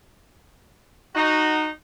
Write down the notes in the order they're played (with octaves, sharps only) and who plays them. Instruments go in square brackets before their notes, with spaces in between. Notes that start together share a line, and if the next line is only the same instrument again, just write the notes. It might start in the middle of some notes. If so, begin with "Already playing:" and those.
[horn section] D#4 F#4